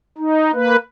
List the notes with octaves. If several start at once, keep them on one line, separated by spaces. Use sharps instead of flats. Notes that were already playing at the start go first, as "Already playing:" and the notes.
D#4
A#3 B4